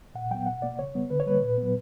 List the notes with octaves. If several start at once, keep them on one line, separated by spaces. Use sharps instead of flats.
A#2 F#5
F#3 B3 G5
B2 F#5
A#3 D5
C#3 C#5
G3 B3
D3 B4
C#5
G3 A#3 B4
A#2
F#3 B3